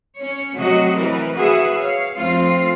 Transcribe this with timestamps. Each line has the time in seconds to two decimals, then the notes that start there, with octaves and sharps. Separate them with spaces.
0.18 C#4 C#5
0.55 C3 F#3 A3 F#4 D#5
0.99 E3 A#4 B4
1.36 F#4 G#4 B4 E5
1.80 C#5 F5
2.17 F2 F3 A3 C4 F4 F5